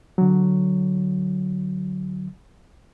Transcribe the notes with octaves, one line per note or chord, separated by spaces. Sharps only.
D3 F#3